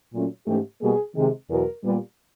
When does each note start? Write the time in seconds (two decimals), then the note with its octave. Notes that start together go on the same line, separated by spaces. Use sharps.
0.13 A#2 F#3 A3 C#4
0.47 G#2 E3 A3 C#4 G4
0.81 B2 G3 A#3 G#4
1.16 C3 D#3 G#3
1.49 E2 B2 F#3 A#4
1.83 A#2 G3 B3